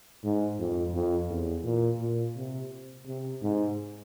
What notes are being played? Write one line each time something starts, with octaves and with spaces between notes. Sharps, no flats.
G#2
F2
F2
E2
A#2
A#2
C3
C3
G#2